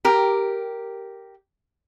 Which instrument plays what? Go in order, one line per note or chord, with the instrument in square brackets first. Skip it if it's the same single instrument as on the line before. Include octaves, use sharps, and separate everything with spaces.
[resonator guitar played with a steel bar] G4 A#4